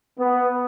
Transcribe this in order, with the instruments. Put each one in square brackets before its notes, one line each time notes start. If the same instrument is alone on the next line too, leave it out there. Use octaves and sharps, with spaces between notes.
[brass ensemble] B3